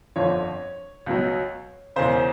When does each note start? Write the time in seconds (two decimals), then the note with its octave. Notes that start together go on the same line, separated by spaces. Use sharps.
0.16 G1 F2 D3 F3 C#5
1.06 C#2 B2 F#3
1.96 E1 E2 C#3 C5